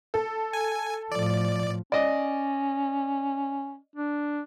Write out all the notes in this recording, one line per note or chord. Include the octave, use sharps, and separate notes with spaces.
A4
G#5
A2 F3 D5
C#4 D5 D#5
D4